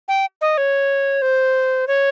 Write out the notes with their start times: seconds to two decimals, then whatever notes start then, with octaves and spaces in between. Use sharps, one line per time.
0.08 G5
0.41 D#5
0.57 C#5
1.22 C5
1.87 C#5